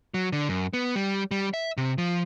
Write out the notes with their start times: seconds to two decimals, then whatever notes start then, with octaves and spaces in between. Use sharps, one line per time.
0.14 F#3
0.33 D3
0.49 F#2
0.73 B3
0.95 G3
1.31 G3
1.54 E5
1.77 C3
1.98 F3